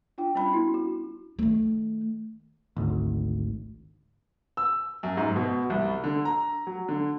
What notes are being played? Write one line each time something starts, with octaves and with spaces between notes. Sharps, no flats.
D4 F4 G5
G3 C#4 D4 B5
B3 C#4 E4 F#4
F#4
D#3 A3
G#1 D2
E6
F#2
G#2
B2
C2
D3
A#5
F#3
D3